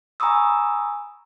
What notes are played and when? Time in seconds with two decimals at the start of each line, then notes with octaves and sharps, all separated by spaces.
0.20 G#5 A#5 B5 C#6 D#6 E6